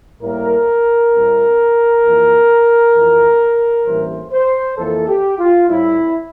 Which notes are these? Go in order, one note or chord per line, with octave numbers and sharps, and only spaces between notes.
A2 G3 A#3 A#4
A2 G3 C4
F2 E3 A#3
F2 E3 A3
A1 G2 E3 A#3 C5
C5
F2 E3 A#3 A4
G4
F4
A2 G3 C4 E4